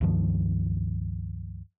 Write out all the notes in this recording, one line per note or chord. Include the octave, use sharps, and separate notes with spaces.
C#2 G2 D#3 F3